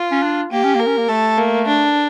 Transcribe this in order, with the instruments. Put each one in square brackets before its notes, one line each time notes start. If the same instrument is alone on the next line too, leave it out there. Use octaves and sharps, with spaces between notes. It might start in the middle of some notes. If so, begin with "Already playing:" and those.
Already playing: [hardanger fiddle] F4
[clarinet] C#4
D4
[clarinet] A#3 [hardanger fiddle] G4
[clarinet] C#4
A#3
[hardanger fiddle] A#4
[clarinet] C#4
A#3
[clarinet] A3 [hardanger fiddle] A4
[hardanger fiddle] A#3
D4